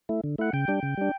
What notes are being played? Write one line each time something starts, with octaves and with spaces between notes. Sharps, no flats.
A3 E4
D3
A3 E4 F#5
C#3 G5
G3 D4
C#3
G3 D4